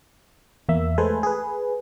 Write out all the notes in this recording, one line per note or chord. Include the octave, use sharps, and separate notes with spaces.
E2 A#3 E5
G#3 A3 A4 B4 C5 G#5
G#4 B4